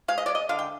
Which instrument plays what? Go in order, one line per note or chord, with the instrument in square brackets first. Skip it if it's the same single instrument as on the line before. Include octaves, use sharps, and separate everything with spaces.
[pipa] G#3 F5
D#5
G#3 D5
D#5
D3 F5
G5